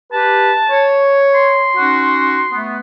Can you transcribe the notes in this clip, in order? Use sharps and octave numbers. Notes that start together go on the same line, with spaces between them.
G4 B4 A5
C#5
C6
C#4 D#4 F#4
A3 B3